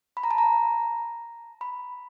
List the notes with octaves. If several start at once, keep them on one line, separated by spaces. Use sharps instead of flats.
B5
A#5
A5
A#5
B5